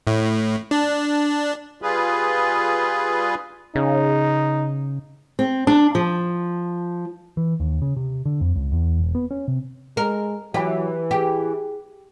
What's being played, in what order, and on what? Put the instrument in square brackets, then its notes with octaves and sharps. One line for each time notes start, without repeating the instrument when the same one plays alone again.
[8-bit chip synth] A2
D4
[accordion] G3 F4 G#4 B4
[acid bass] C#3 [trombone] D#4
[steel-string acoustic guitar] C4
D4
F3
[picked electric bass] E3
D#2
C#3
C3
D3
F2
C#2
E2
E1
B3
C#4
C3
[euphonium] G#3 [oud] A#4
[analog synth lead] E3 [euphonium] F#3 [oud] G4
[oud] G4 [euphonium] G#4